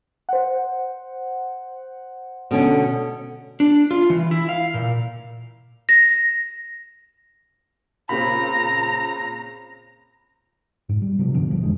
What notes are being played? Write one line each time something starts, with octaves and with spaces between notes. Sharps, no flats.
C5 F#5
B2 D3 C#4
D4
F4
E3
E4
F5
A#2
A#6
A#2 C#3 C4 A#5 B5
G#2
G3
C3 F3 F#3
G2 B2 D3 F3
D2 E3 F3 G3
F2 D3 D#3 G#3